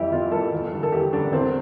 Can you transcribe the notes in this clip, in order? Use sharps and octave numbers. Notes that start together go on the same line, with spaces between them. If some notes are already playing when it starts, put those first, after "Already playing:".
Already playing: F2 E3 G3 E4 G4
F2 F4
E3 G3 A4
E2
D3 G3
A4
E2 G4
D3 G3 D4
E2 C4